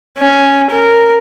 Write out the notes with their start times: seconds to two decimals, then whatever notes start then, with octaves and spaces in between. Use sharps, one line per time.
0.18 C#4
0.71 A#4